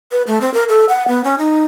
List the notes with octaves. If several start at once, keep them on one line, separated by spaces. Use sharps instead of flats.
B4
A3
C4
A#4
A4
F#5
B3
C#4
D#4